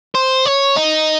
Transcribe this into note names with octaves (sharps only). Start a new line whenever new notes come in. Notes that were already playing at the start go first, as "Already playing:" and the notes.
C5
C#5
D#4